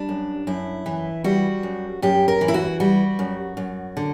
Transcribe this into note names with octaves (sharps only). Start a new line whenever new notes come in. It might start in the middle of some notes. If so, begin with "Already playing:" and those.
Already playing: G3 D4
F#2
F#2 E4
E3
G3 F#4
F#2
F#2 G4
A#4
E3
E4
F#4
G3 F#4
F#2
F#2
D3